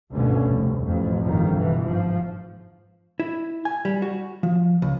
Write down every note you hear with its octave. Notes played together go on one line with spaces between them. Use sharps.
G#1 D2 G2 B2 D3 C#4
F1
A1 F2
G1 F2 D#3 F3
B2 E3
G#2 F3
E4
G#5
G3
F#4
F3
C#2